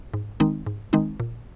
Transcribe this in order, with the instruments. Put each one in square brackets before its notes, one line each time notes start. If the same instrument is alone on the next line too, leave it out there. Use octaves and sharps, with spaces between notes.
[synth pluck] G#2
D#3 G#3 C4 D#4
G#2
D#3 G#3 C4 D#4
A#2